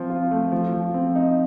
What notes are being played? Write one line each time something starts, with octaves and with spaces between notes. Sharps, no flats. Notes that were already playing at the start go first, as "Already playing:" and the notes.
Already playing: F3 C4
F4
A3
F3
F3
C4
D#4